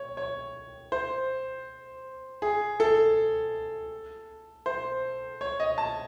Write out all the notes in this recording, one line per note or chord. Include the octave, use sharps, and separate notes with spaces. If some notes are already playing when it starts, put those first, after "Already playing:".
Already playing: C#5
C#5
C5
G#4
A4
C5
C#5
D#5
A5